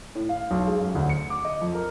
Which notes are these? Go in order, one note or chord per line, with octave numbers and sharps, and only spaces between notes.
A2
F5
B1
G#3
F#2
D2
C#7
D6
D#5
F2
A#4